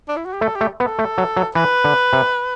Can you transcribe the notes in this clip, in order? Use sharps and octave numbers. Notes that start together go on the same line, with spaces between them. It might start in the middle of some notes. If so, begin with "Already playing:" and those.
D4
E4
F#4
G4
A3 A4
G4
A3
B3
A4
A3
F#3
F#3
E3 B4
D3
C3